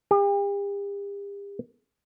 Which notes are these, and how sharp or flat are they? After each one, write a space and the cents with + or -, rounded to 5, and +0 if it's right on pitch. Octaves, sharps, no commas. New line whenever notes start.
G4 +40